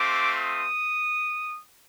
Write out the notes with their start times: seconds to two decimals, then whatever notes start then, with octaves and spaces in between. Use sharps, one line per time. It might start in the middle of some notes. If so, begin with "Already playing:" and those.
Already playing: A3 C4 F4 D6
0.39 D#6